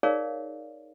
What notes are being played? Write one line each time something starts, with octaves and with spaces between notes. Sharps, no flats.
D#4 G#4 A#4 C#5 D5 F5